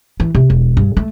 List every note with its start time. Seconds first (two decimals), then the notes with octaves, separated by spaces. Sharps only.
0.20 E3
0.35 C3
0.50 E1
0.77 G2
0.97 A3